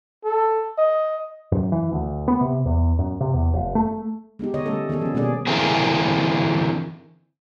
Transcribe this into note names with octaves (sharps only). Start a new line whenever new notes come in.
A4
D#5
F#2
E3
D2
B3
C3
E2
F#2
C3
E2
F1
A3
G#3 B3 D#4 G4
D3 C#5 D#5
G3 A3 C#4 A4
D#3 B3 G#4 A4
F3 C#4
B2 G3 A#3 C#4 G#4 D5
D3 E3 A#3 C4 G#4